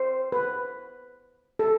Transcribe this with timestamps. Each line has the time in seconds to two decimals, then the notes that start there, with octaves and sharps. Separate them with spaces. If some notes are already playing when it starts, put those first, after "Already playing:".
Already playing: C5
0.32 B4
1.59 A4